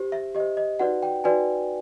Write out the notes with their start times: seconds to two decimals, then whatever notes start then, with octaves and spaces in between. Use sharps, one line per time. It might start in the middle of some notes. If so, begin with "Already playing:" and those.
Already playing: G4 C5
0.12 E5
0.35 G4 D#5
0.40 C5
0.57 D#5
0.79 D#4 F#4 B4 D5 F#5
1.03 G5
1.24 D#4 F#4 B4 D5 G#5